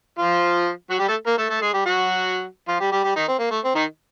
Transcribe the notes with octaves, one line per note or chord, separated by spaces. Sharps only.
F3 F4
F#3 F#4
G3 G4
A3 A4
A#3 A#4
A3 A4
A3 A4
G#3 G#4
G3 G4
F#3 F#4
F3 F4
G3 G4
G3 G4
G3 G4
D#3 D#4
C4
A#3
A3
C4
D#3 D#4